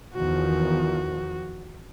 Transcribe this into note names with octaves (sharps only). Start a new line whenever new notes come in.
E2 D#3 F3 F#4